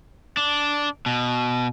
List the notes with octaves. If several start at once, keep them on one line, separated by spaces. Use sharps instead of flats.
D4
B2